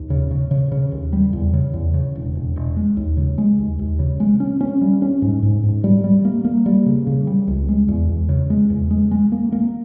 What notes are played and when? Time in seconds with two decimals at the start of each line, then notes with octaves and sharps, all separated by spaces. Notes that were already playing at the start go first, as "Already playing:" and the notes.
Already playing: D#2
0.10 C#3
0.31 C#3
0.51 C#3
0.72 C#3
0.92 D#2
1.13 G3
1.33 E2
1.53 C#3
1.74 E2
1.94 C#3
2.15 E1
2.35 E1
2.56 E1
2.77 G#3
2.97 D#2
3.17 C#3
3.38 G#3
3.59 D#2
3.79 D#2
3.99 C#3
4.20 G#3
4.40 C#4
4.61 C#4
4.81 G3
5.02 C#4
5.22 G#2
5.43 G#2
5.63 G#2
5.84 G3
6.04 G3
6.25 A#3
6.45 A#3
6.66 G3
6.86 C#3
7.07 C#3
7.27 G3
7.47 C#2
7.69 G#3
7.88 E2
8.09 E2
8.29 C#3
8.50 G#3
8.70 E2
8.91 G#3
9.11 G#3
9.32 A#3
9.52 A#3